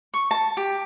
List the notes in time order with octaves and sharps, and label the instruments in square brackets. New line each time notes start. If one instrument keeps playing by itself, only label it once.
[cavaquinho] C#6
A5
G4